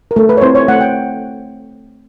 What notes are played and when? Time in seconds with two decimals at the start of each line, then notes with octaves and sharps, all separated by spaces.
0.11 A#4
0.16 A3 A4
0.29 B4
0.37 C#5
0.41 C4 E4 C5
0.55 C#5
0.68 A3 F#5
0.81 G5